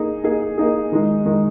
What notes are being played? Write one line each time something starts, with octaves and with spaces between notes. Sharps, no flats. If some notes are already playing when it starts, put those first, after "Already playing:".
Already playing: A#3 D#4 G#4
A#3 D#4 G#4
A#3 D#4 G#4
D#3 G#3 D#4
D#3 G#3 D#4